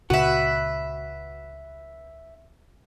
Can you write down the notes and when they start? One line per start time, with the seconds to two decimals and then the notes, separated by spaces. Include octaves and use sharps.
0.10 C#2 A#2 C#3 F#4 B4 E5